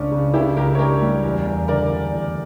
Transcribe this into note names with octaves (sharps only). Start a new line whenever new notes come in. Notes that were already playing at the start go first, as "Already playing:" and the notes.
Already playing: C#2 C#3 C#4 D4
C#3
C#3 E4 G4
C#2 G4 A#4
C#5
D4 G4 A#4
G3
E2
E2
D3 A#4 D5
D3
E2